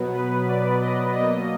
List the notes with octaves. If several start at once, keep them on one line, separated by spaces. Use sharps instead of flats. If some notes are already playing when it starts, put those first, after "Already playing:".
Already playing: B2 F#3 B3
B4
D5
D#5
B2 F#3 A#3 D#5